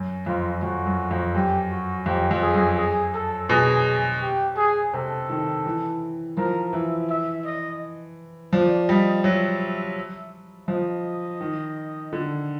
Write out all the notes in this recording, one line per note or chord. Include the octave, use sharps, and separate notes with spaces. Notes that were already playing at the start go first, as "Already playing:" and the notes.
Already playing: F#2
F2 F4
F2 F#4
F#2
F2
F#2 G4
F#4
F2 G4
F2
G#4
F#2
G#4
A4
B2 G#4
G4
G#4
C3 A4
D#3
E3
F3 A#4
E3 E5
E5
D#5
F3 D5
G3 D#5
F#3 E5
F3 D#5
D#3
D3